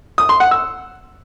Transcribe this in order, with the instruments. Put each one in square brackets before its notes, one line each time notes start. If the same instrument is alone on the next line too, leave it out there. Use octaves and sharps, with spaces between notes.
[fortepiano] D#6
C6
F#5
E6